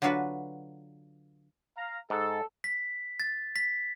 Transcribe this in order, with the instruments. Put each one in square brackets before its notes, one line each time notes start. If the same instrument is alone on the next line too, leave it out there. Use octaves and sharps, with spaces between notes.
[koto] D3 F#3 D4 F4 F#4 B4
[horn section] F5 A#5
[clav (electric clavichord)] G#2 [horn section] A4
[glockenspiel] B6
A6
B6